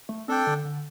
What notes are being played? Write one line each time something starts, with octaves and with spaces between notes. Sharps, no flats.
A3
C4 D4 A4 D5 G5
D3
D3